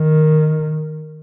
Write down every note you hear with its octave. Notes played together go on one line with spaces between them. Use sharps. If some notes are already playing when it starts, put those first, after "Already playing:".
Already playing: D#3